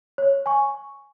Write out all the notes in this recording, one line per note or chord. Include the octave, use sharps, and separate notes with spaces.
C#5
G#5 C#6